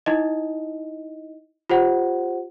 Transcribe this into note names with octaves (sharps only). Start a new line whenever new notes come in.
D#4 E4 D#5
F4 G4 C5 F#5